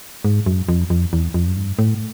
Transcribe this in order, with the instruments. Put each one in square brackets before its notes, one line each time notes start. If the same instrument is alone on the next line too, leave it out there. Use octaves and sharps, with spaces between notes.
[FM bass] G#2
F#2
F2
F2
E2
F2
F#2
G2
A2